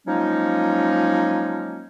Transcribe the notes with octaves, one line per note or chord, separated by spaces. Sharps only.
F3 F#3 G#3 A#3 C#4 D#4